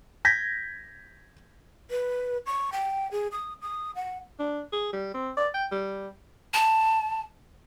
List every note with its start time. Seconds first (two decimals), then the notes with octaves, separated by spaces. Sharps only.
0.25 G6 G#6 A#6 B6
1.91 B4
2.46 C#6
2.73 G5
3.12 G#4
3.32 D#6
3.62 D#6
3.96 F#5
4.40 D4
4.72 G#4
4.93 G3
5.14 C4
5.37 D5
5.54 G5
5.72 G3
6.54 A5